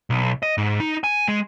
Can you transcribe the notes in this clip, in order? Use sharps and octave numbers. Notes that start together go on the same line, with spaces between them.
B1
D#5
G#2
D#4
G#5
G#3